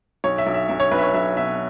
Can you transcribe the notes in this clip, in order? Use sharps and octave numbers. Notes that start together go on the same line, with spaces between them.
B1 C#5
E5
B1
E5
B1 E5
C#5
B1 B4
E5
C#5
B1 E5
B2 E5